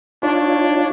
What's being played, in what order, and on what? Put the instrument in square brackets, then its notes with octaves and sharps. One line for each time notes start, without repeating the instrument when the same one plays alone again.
[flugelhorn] D4 [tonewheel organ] D#4 F4 C#5